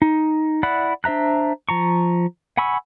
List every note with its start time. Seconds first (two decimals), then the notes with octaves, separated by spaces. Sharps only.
0.02 D#4
0.63 E4 D5 F#5 B5 F#6
1.04 D4 C5 E5 A#5 F#6
1.69 F3 A#5 C#6
2.57 F#5 G#5 B5 C#6 E6